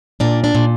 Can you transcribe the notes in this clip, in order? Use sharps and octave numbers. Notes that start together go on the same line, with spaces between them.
A#2 D4
D4
A#2